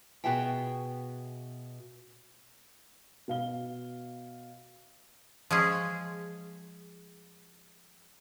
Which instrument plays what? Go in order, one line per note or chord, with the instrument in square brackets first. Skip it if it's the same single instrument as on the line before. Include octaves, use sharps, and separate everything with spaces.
[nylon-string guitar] B2 B3 F#4 G#4 E5 G5
[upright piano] B2 F5 G7
[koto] F3 G#3 C#4 G#4